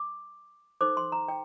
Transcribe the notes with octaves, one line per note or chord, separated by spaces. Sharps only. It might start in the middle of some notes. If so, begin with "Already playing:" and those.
Already playing: D6
D#4 A4 C5 D6
C6
A#5
G5